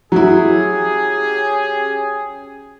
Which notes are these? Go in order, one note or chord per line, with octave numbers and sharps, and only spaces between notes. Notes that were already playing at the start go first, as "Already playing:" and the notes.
F#3 C#4 E4 G4 G#4